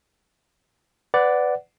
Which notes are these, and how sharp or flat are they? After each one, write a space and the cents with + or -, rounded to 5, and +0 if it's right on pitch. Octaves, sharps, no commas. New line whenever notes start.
B4 +20 D5 +0 F#5 +0